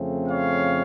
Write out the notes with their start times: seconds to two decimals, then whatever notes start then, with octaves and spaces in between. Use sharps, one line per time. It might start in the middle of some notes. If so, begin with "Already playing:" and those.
Already playing: F2 C#3 A3 C4
0.29 C#5 F5